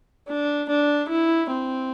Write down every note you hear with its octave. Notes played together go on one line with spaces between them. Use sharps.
D4
D4
E4
C4